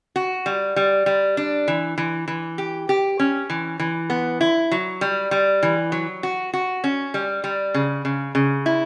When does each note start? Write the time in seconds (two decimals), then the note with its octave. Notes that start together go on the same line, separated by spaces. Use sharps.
0.16 F#4
0.46 G3
0.76 G3
1.06 G3
1.37 D4
1.68 E3
1.98 E3
2.28 E3
2.58 G4
2.89 G4
3.20 C#4
3.50 E3
3.79 E3
4.10 B3
4.41 E4
4.71 F#3
5.01 G3
5.31 G3
5.63 E3
5.92 F#3
6.23 F#4
6.53 F#4
6.84 C#4
7.14 G3
7.44 G3
7.74 C#3
8.05 C#3
8.35 C#3
8.66 E4